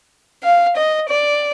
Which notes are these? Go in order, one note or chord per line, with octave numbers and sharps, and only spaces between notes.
F5
D#5
D5